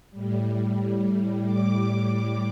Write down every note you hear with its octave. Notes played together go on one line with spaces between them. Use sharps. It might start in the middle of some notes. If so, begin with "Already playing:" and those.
A2 G3
A2 G3 D6